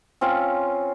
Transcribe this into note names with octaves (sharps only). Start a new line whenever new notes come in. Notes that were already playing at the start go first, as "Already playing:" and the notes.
C4 C#4 F4 F5